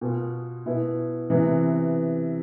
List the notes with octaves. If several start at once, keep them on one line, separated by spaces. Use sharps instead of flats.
B2 B3 F4
B2 B3 E4
C3 E3 B3